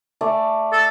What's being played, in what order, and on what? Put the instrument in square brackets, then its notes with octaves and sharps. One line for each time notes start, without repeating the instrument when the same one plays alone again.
[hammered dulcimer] A3 D5
[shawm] A4